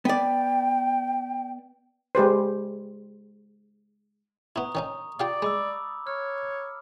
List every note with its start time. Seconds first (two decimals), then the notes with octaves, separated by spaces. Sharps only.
0.05 B3 D5 G5
2.15 G#3 G4 B4 C5
4.56 B3 E4 A#5 C#6 D#6
4.75 D#3 C#4 D#4
5.20 F4 G4 D5 F5
5.42 G#3 B5 D6 E6
6.07 C#5 F6